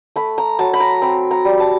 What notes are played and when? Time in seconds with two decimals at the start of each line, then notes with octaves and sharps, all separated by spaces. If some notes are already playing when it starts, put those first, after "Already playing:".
0.16 A3 B5
0.38 A#5
0.59 F#3 A5
0.73 B5
0.80 A#5
1.02 C4 B5
1.31 A#5
1.45 G3
1.60 A5